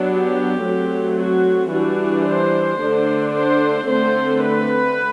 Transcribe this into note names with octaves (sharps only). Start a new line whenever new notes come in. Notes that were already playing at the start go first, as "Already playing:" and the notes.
Already playing: F#3 B3 D4
G4
F#3 A3 C4
F#4
E3 G3 D4 F#4
C5
D3 A3 D4
C5
D3 A3 C4 C5
B4